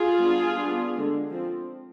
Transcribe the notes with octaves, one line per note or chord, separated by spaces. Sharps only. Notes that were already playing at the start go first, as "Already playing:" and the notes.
Already playing: F4 G#4
G3 B3 D4
G3 B3 D4
D3 G#3 D4
F3 C4